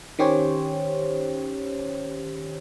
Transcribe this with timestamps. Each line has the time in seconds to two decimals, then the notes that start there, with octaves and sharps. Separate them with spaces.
0.19 D#3 C#4 G4 C5 C#5